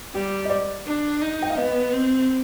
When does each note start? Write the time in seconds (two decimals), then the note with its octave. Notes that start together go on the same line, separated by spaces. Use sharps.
0.14 G3 G4
0.45 D#5
0.50 D5
0.86 D4
1.21 D#4
1.42 G5
1.50 F5
1.57 B3 D#5
1.93 C4